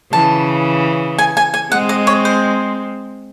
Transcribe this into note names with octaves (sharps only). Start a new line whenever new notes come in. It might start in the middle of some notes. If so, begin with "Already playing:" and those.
C#3 E3 A5
G#5
G#5
G#5
G#3 C4 F#5
D#5
C#5
C5